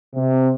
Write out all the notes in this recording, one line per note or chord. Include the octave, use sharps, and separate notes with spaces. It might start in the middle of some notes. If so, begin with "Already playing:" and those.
C3